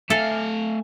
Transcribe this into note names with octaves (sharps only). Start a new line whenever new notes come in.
A3 A4 E5 F5 G#5